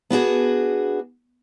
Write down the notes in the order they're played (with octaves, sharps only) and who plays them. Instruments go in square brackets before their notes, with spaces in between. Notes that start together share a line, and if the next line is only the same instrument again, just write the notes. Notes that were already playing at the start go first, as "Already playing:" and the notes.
[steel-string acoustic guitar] B3 D4 F#4 G#4